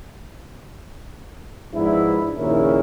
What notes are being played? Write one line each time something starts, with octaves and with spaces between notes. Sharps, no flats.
G#2 F3 B3 D4 E4
A#1 D#2 C#3 C#4 E4 A#4